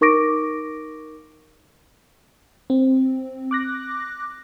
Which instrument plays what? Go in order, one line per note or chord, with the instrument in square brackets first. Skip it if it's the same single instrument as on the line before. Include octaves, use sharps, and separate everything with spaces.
[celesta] D#4 A#4 C#6 D6 A#6 D7
[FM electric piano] C4
D6 F#6 A#6